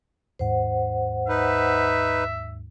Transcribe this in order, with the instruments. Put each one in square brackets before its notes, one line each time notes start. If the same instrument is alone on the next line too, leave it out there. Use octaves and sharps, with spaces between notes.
[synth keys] D#2 G#2 [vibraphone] C5 F#5
[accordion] D#4 B4 [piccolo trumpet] E5